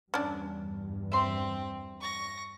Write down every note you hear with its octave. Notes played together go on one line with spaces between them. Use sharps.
E2 G2 C#4 D4
C4 E5 C6
C#6 A#6